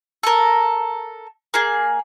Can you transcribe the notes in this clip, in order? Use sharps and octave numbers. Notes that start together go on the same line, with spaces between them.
A4 A#4
A#3 G#4